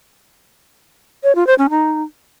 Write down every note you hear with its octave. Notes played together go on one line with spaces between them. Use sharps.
C#5
F4
C5
C#4
D#4